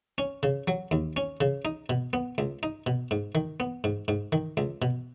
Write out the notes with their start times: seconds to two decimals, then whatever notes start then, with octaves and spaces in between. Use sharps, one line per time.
0.18 C#4
0.43 C#3
0.68 F#3
0.91 D#2
1.17 C#4
1.41 C#3
1.65 D#4
1.90 B2
2.13 B3
2.38 C#2
2.63 D#4
2.87 B2
3.11 G#2
3.35 D#3
3.60 B3
3.84 G#2
4.08 G#2
4.32 D#3
4.57 C#2
4.82 B2